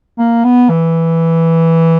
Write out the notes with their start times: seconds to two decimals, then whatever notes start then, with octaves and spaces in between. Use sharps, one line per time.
0.18 A#3
0.44 B3
0.69 E3